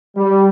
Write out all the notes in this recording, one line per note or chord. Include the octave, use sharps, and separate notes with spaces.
G3